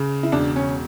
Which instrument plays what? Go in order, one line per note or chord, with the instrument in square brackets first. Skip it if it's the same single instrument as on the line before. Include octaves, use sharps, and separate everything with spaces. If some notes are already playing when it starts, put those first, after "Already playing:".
Already playing: [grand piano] C#3
[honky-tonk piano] E4
[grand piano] E1 [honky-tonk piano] D4
[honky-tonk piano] C#4